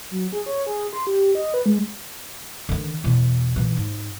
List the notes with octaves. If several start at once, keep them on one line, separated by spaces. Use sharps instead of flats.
F#3
G#4
C#5
G#4
C6
G4
D#5
B4
G#3
D3 D#3
E2 B2
A#2 E3
G#2